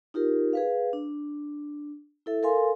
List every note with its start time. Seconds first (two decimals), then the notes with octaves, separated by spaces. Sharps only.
0.14 D#4 F4 G4 A#4
0.53 G#4 B4 F5
0.93 D4
2.26 E4 A4 E5
2.43 A4 A#4 F5 G#5 C6